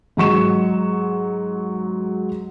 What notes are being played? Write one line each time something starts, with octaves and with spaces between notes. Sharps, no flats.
G#2 F#3 C#6 E7